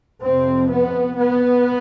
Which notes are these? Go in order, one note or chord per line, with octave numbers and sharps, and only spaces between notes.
F2 C3 C4
B3
B3